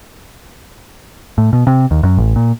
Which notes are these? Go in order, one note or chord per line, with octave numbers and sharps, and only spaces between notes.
A2
B2
C3
D#2
F#2
A1
A#2